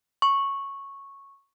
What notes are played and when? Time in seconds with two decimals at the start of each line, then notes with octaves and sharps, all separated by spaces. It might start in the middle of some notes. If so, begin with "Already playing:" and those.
0.22 C#6